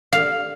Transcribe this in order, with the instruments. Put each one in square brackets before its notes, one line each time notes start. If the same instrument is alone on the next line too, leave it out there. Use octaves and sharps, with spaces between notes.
[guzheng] F5